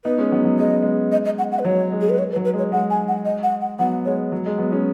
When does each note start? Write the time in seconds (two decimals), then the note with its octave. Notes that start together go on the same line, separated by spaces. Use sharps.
0.05 B3 D#4 B4
0.18 G#3 C#4
0.32 F#3 B3
0.45 F#3
0.58 G#3 D#5
0.70 B3
0.82 G#3
1.12 D#5
1.25 D#5
1.38 F#5
1.52 F#5
1.59 B4
1.65 F#3 C#5
1.92 G#3
2.01 G#4
2.10 B4
2.19 C#5
2.32 B4
2.36 F#3
2.45 B4
2.54 G#3 C#5
2.72 G#3 F#5
2.90 G#5
3.08 F#5
3.25 D#5
3.43 F#5
3.61 F#5
3.79 F#3 B3 F#5
4.05 G#3 C#5
4.32 F#3
4.46 G#3
4.58 F#3 B3
4.72 G#3 C#4